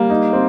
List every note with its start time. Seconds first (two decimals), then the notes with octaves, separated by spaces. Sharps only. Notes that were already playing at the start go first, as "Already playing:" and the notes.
Already playing: G3 A#3
0.10 D#4
0.33 C4